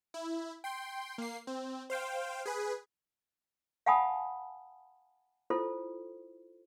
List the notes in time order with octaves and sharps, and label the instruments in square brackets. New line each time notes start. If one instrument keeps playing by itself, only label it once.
[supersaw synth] E4
G5 C6
A#3 C7
C4
C5 F5 G5
G#4 B4
[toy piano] F5 F#5 G#5 A5 B5 D#6
E4 F4 A4 C5